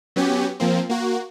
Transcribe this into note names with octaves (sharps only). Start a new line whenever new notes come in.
F#3 B3 C#4 G4
F3 A#3 C4
A#3 F#4